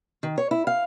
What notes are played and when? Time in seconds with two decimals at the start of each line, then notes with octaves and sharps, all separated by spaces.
0.23 D#3
0.38 C#5
0.51 E4
0.67 F5